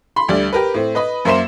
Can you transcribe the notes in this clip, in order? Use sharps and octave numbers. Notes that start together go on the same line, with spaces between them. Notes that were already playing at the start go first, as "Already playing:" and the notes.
B5 C6
D2 G3 D5
G4 A#4 B4
A2 C4
B4 D#5 B5
F#2 A#3 C5 E5 C6 E7